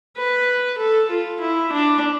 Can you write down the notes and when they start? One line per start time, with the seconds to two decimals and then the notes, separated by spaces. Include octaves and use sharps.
0.17 B4
0.78 A4
1.10 F4
1.41 E4
1.73 D4